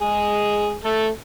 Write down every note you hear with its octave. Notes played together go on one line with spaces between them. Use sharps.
G#3 G#4
A3 A4